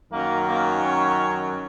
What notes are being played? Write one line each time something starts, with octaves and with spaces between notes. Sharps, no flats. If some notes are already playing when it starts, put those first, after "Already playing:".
F#2 D#3 F#3 A#3 A#4
A#3 A#4
C#4 C#5